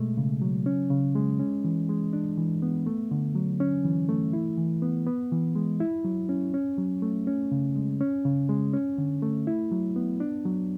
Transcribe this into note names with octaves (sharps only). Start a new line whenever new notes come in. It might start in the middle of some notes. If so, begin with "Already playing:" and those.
Already playing: B2 G#3 A3
C#3
F#3
C#4
C#3
G#3
C#4
E3
G#3
D4
E3
B3
A3
D3
F#3
C#4
E3
A3
E4
E3
B3
B3
E3
G#3
E4
F#3
C#4
C#4
F#3
A3
C#4
C#3
G#3
C#4
C#3
G#3
C#4
D3
A3
E4
F#3
B3
D4
F#3